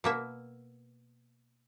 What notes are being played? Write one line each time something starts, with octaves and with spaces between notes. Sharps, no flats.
B2 A#3 E5